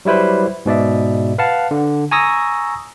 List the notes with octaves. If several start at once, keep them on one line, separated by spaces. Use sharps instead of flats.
F#3 G3 E4 B4 C5
G#2 B2 D5 E5
B4 F5 F#5 A5
D3
G#5 A#5 C#6 D#6 E6 A#6